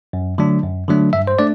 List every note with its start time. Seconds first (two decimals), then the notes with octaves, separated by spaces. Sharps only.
0.13 F#2
0.38 D3 F#3 A3 D4
0.63 F#2
0.88 D3 F#3 A3 D4
1.13 G2 E5
1.27 C5
1.39 A3 D4 D5